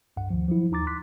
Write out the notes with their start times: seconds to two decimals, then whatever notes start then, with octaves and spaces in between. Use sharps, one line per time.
0.17 C2 G2 F#5
0.30 D2 D#3 F3
0.48 F3 F#3 E4
0.71 D#2 D#4 A#5 D6 A6
0.87 C6 D6 F#6 B6